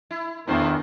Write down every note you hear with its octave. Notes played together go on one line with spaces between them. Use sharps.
E4
E2 A#2 D#3 A3 B3 D4 E4 C5